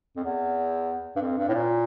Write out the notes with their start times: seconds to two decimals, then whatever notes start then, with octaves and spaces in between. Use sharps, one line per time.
0.16 F2
0.24 E2
1.16 G2
1.22 F2
1.38 G2
1.49 A2
1.54 A#2